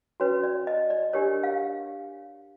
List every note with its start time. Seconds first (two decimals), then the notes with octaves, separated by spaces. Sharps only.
0.20 C#4 F#4 B4 C#5
0.43 D5
0.67 D#5
0.90 D5
1.13 D4 G4 A#4 C#5
1.43 F5